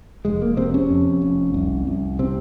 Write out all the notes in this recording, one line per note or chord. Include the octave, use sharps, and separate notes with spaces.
F1 G#3
A#3
C3 C4
C#4
F2
F1
C2
C2
C3 C4